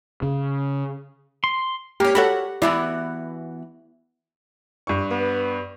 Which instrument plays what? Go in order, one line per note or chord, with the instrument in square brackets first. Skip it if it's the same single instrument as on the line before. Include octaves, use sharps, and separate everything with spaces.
[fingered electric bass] C#3
[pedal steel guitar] C6
[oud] A#3 C#4 [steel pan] G4
[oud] F#4 A4 C#5 [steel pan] F#5 B5
[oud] E3 B3 F#4 [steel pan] E4 D5
[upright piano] G2 C#6
[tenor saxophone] B3